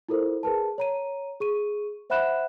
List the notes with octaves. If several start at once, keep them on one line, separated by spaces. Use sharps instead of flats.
E4 F4 A4 A#4 C5
G#4 A#4 B4 A5
C#5 A#5 D#7
G#4 C#6 D#7
C5 E5 F#5 B5 F#6 E7